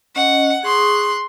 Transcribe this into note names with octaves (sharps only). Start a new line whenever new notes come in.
C#4 D#5 F#5
G#4 C6 C#6 D#6 F#6